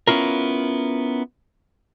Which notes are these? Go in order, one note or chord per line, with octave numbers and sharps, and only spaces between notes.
B3 C#4 E4 F4 A#4